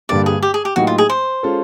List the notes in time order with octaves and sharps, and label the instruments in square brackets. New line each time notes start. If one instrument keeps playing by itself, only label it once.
[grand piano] G2 D3 G3 A#3 [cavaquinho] D5
[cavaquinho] G#4
G4
G#4
G4
[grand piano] A2 F#3 A#3 D#4 G4 [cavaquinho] F#4
[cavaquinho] F4
G#4
C5
[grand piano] G#3 C#4 F4 A4